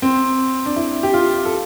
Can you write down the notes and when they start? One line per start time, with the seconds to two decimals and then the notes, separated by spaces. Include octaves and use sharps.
0.02 C4
0.66 D4
0.76 E4
1.03 G4
1.14 F4
1.45 A4